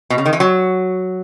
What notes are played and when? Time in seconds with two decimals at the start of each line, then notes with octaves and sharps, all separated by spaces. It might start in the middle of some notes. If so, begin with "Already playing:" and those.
0.10 B2
0.18 C#3
0.26 D#3
0.33 E3
0.40 F#3